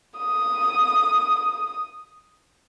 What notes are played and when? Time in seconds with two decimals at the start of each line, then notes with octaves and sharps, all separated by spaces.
0.18 D#6